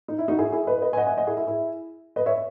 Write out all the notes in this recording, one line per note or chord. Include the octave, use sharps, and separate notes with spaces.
D#4
E4
D#4 F#4
E4 G#4
E4 G#4
B4 D#5
B4 D#5
G#5
D#5 F#5
E5 G#5
D#5 F#5
E4 G#4
E4 G#4
E4 G#4
B4 D#5
C#5 E5